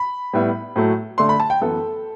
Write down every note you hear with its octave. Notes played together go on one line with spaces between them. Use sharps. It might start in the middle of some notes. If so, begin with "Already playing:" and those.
Already playing: B5
A2 G3 B3 E4
A2 F#3 A3
D3 A3 D4 C6
B5
A5
G5
F#2 E3 B3 A4